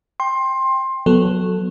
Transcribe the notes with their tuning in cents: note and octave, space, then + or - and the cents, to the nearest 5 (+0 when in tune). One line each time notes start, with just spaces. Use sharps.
G5 +15 C6 +20
F#3 -20 B3 +0 A4 +0